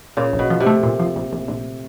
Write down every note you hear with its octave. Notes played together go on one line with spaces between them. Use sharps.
A#2 C#3
A#1
B2
F3
C3
A3
A#2
F3
A#1
A#1
A#1